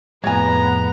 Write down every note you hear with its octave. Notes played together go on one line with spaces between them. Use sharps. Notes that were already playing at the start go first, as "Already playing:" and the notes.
F2 A2 G#3 B3 C#5 G#5 A#5